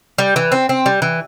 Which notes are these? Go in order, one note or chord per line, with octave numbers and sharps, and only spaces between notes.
G3
E3
C4
C4
G3
E3